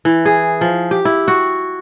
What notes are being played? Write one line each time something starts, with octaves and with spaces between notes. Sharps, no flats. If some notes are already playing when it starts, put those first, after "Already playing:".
E3
G#4
F3
G4
E4
F#4